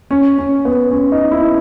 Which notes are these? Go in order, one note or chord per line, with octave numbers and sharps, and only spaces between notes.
C#4
C#4
B3
C#4
D#4
E4